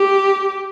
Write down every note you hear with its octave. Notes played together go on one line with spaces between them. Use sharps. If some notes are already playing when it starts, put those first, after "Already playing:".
Already playing: G4